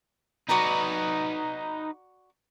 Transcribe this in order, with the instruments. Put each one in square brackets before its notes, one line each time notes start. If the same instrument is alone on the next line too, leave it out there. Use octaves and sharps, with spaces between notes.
[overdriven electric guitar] D#4 B4 [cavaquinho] F#4 D5 A#5